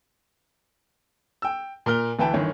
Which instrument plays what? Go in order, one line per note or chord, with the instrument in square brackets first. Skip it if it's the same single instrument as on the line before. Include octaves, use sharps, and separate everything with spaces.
[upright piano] G5 E6
A#2 A#4 F6 G7
D2 E3 B4 E5 G5 A5
G1 D#3 E3 C#5